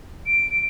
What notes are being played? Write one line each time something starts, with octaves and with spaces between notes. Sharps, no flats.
D7